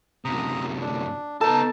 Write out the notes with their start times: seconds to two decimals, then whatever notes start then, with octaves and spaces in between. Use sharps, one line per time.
0.25 F#2 C3 A#5 D#6
0.80 D4
1.41 B3 D#4 A4 A5